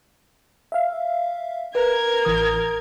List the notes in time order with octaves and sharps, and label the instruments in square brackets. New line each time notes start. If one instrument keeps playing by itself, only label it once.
[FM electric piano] E5 F5
[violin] A#4 G#6 [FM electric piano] B4
[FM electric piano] A1 E3 D#6